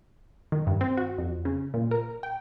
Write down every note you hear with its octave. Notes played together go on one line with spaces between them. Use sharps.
D#3
G2
C4
F#4
F2
C#3
A#2
A#4
G5